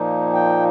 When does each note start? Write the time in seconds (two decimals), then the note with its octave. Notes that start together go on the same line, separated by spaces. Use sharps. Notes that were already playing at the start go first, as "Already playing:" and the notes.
Already playing: A#2 F3 A#3 D#4
0.33 G5